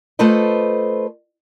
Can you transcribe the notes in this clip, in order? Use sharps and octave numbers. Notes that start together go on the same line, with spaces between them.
A3 F4 A4 B4 C5 D#5